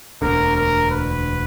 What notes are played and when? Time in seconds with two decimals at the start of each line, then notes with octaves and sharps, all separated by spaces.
0.22 E1 D2 D3 A#4
0.56 A#4
0.91 B4